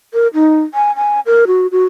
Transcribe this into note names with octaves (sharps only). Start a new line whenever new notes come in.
A#4
D#4
G#5
G#5
A#4
F#4
F#4